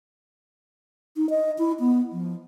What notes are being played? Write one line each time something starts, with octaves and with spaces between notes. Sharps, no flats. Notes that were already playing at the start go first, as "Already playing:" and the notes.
D#4
D#5
E4
B3
F3